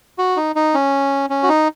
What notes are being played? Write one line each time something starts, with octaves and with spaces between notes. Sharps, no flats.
F#4
D#4
D#4
C#4
C#4
F#4
D#4